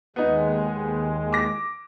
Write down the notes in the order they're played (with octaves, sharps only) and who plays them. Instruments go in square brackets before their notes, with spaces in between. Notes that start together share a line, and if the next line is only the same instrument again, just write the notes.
[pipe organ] D#2 G#3 [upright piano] B3 D#4
[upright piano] D6 A#6